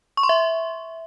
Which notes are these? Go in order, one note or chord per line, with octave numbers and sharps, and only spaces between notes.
C#6
C6
E5